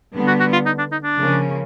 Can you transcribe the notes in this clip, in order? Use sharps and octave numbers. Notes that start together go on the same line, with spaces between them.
D3 G3 B3
F#4
F#4
F4
D#4
D4
D#4
D4
C#3 F3 A#3 C#4